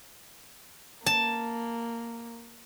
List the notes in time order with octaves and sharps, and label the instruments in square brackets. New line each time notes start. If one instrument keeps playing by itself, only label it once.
[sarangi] A#3 [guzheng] A5